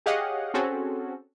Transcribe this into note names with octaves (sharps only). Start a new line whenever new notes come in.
G4 G#4 C#5 D#5 F5 F#5
C4 C#4 F#4 G#4 A4